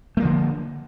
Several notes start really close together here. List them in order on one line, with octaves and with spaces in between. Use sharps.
A3 A#3 F3 D3